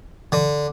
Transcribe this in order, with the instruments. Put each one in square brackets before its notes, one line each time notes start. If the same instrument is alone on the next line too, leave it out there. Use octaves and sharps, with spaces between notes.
[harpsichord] D3